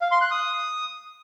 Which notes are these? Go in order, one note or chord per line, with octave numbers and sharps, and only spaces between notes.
F5
C6
F#6
D#6